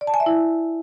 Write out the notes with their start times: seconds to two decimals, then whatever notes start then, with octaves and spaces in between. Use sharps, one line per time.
0.01 D5
0.07 A5
0.14 G#5
0.20 E5
0.26 E4